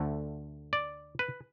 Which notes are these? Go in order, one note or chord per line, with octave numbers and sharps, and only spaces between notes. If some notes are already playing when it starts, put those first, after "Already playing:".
Already playing: D2 D3 A3
D5
B4